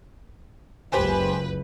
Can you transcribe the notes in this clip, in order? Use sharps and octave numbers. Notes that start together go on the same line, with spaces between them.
F#1 C#2 G4 B4 C5 G#5